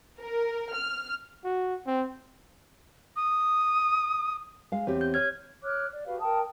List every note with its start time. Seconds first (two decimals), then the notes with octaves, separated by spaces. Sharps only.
0.20 A#4
0.74 F6
1.44 F#4
1.87 C4
3.16 D#6
4.72 G#3 F5
4.87 E2 C4 G4 C#5
5.01 G6
5.14 C#5 F6 G#6
5.62 C#5 D6 F6 F#6
5.93 D5
6.04 F#4 G4 B4 F5
6.20 A#4 G5 A5 D#6